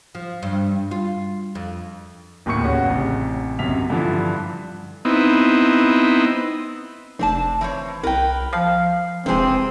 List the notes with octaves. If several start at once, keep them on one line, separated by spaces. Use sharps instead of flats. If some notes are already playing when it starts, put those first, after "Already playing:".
F3
G2
F4
F2
D#1 D2 A2 C#6 C#7
C#3 B3 C#4 F#4
A1 C3
B1 F#2 C3 B6 F7
G2 D3 E3 F3
B3 C4 D#4 E4
F1 C4 D4 A5
E3 C4 C#5
C2 A#4 B4 G5
F3 F5
E1 C3 E3 C4 G#4 C5 G5